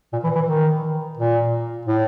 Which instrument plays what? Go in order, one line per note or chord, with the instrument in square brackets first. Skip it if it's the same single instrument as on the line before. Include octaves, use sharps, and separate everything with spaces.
[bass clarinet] A#2
E3
E3
D#3
A#2
A2